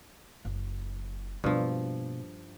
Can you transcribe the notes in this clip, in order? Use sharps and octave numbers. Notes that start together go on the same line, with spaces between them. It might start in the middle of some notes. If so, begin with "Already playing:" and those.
F#1
G2 B2 F3 A#3